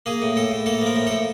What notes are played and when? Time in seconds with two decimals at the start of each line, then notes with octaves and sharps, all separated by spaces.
0.06 A#3 G#4
0.22 A2
0.36 A2 A4
0.52 A2
0.66 A#3 A4
0.82 F3 A#4
0.96 A2
1.07 A4
1.11 A2